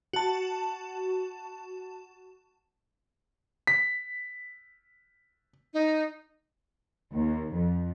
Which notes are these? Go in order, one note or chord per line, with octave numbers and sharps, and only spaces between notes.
F#4 A5
B6
D#4
D#2
F2